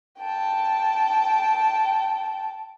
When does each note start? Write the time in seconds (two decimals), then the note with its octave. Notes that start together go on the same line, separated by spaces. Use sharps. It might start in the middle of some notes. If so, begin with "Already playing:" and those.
0.19 G5 A5